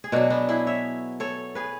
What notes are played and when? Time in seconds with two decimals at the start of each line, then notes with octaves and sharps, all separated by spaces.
0.04 G#4
0.12 B2 F#3 D4 F#4
0.30 B3 D4
0.49 E4 G#4
0.67 C#5 E5
1.20 A4 C#5
1.55 G#4 B4